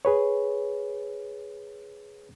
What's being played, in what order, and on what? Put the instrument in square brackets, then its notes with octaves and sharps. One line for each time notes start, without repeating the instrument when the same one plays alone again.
[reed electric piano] G#4 B4 C#5